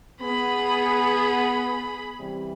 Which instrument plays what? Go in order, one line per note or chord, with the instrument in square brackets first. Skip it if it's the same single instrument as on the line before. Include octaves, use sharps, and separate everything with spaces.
[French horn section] B3 [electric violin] G#4 B5
[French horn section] C3 E3 G3